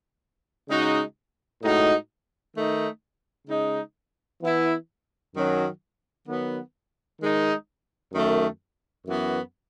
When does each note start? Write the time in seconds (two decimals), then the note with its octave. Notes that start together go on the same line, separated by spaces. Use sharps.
0.68 C#3 G#3 D#4 F#4
1.61 A2 G#3 D#4 F#4
2.54 D#3 A3 D#4
3.47 C#3 G#3 D#4
4.41 E3 B3 E4
5.33 F#2 D#3 F#3 C#4
6.27 D#3 F#3 B3
7.20 D#3 G#3 D#4
8.13 F#2 D#3 A3
9.06 F#2 E3 B3 F#4